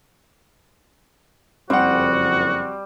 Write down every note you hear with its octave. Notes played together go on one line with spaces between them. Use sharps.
F#1 F2 G3 C4 F#4 C5 F#5